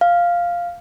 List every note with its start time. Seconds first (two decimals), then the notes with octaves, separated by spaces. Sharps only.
0.01 F5